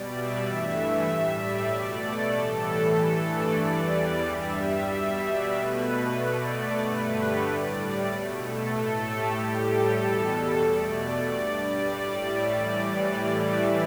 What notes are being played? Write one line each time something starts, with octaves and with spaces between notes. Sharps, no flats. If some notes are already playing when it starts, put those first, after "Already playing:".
Already playing: B2 G3 D5
E5
G2 E3 A3 E5
A2 G3
D5
B2 A3
A4
A2 E3 G3
G2 E3 A3 A4
D5
E2 E3 G3
G2 G3 E5
B2 G3
D5
B2 A3 B4
B2 A3 D5
G2 D3 A3 B4
G4
A2 G3 D5
B2 A3
A4
A2 A3
G4
A2 G3
A4
E2 B2 G3 A4
B2 A3 D5
G2 G3 D5
D5
A2 G3
E5
A2 E3 G3 D5
A2 E3 G3
E5